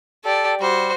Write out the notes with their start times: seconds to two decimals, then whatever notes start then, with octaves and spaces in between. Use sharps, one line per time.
0.25 G4 A4 D5
0.60 G3 F#4 C5